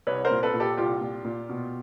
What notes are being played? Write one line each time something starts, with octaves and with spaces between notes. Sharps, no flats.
C2 B4 C#5
A#4 C5
A#2
A4 B4
A#2
G4 A4
C2 F4 G4
A#2
A#2
B2